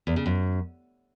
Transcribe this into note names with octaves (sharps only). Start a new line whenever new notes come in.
E2
C#3
F#2